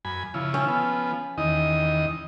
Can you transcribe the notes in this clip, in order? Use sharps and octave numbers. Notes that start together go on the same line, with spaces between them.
F#2 G#5 B5
C#3 F3 E4
C#4
F3 B3
E2 D#3 D#5